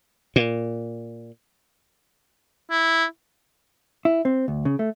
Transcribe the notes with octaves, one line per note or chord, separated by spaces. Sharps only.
A#2
E4
E4
C4
D2
C#3
A3